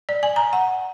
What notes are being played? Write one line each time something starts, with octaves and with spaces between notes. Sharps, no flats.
D5
G#5
A#5
F#5